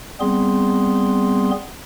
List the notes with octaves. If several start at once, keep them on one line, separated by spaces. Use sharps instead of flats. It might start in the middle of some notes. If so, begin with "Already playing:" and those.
G3 B3 C4 G#4 C6